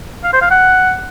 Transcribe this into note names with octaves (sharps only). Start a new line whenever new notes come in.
F5
C5
F5
F#5